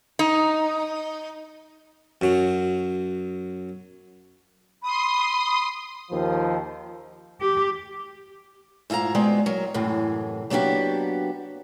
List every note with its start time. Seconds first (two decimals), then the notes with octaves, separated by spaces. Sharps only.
0.19 D#4
2.21 F#2 F#3
4.83 B5 C6 D#6
6.10 D#2 F3
7.41 G4
8.90 G#2 E4 F4 A#4 A#5
9.15 G#3 B3 C4 F#4 D5
9.46 F#3 A#4
9.74 F#2 A2 C3 E3
10.50 F#3 A#3 B3 D4 F#4 G4